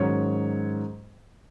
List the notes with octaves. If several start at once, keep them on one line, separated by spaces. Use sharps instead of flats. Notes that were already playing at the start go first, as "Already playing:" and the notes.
Already playing: G#2 D#3 F#3 C#4 C#5